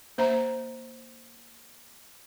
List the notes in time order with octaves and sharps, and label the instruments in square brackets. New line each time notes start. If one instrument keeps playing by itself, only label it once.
[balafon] A#3 C5 E5 A#5